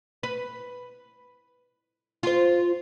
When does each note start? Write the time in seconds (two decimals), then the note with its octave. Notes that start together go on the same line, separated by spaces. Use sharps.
0.23 B4
2.23 F4 C5